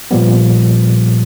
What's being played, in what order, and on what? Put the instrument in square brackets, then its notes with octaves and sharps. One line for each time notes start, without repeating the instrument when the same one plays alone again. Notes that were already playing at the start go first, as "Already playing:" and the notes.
[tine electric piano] A#2 F3 G3 B3